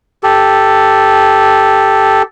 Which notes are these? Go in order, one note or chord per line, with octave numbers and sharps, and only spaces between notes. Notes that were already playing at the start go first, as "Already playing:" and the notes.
G4 A4